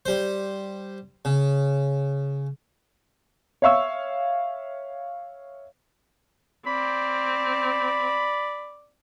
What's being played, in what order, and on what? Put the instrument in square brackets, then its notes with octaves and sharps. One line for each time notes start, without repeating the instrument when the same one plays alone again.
[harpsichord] G3 C5
C#3
[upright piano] C#5 E5 F5 C#6 E6
[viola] C4 [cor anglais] D5 [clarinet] B5